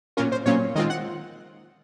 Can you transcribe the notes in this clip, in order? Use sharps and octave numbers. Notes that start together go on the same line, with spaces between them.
A#2 F#3 A#3 C#4 F4 A#4
C5
A#2 F#3 A#3 C#4 F4 C#5
D#3 G#3 C4 F4 D#5
F#5